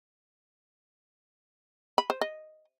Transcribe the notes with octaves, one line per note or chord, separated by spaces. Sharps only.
B5
C5
D#5